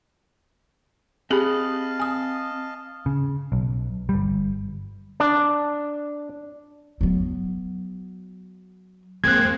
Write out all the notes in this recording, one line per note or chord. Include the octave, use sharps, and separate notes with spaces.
C4 G4 G#4 D#5 F5 G#5 A5 B5
G#5 D#6
C#3
B1
G1 G3
D4
F#3 B3
F2 G#3 A#3 C4 F#6 G#6